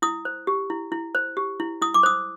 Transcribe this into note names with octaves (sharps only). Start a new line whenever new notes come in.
E4 D#6
C5
G4
E4
E4
C5
G4
E4
E4 D#6
D6
C5 D#6